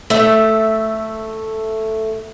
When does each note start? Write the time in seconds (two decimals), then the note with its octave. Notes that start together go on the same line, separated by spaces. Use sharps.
0.10 A3 E5